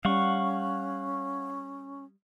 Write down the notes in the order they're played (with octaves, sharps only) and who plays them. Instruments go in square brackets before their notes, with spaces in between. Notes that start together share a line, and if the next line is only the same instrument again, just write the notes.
[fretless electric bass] G3 [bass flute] C#4 [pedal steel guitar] F5 F#5 C#6